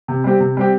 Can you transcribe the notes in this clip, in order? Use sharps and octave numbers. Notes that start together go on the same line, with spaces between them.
C3
G3 C4 G4
C3
G3 C4 G4